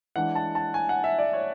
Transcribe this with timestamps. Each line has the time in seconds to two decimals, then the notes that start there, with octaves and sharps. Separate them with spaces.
0.16 E3 G#3 D4 F#5
0.35 A5
0.55 A5
0.74 G#5
0.89 F#5
1.04 E5
1.19 D5
1.33 C#5